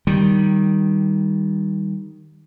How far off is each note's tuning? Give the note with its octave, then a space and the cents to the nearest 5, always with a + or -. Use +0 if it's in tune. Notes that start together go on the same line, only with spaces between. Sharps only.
D#3 +0 G3 +0